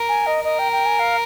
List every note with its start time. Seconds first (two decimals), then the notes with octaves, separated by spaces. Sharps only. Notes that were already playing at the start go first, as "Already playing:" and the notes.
Already playing: A#4
0.09 G#5
0.26 D#5
0.44 A#4 D#5
0.59 G5
0.72 G5
0.86 G#5
0.99 F5